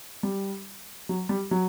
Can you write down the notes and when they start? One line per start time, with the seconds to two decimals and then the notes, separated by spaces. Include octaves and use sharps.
0.23 G3
1.09 F#3
1.29 G3
1.51 F#3